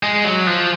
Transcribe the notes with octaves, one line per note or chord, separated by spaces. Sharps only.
G#3
F#3
F3